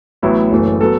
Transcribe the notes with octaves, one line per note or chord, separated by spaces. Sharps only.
A1 A2 F#3 B3 E4
F#1 F#2 E3 A3
F#3 B3 A4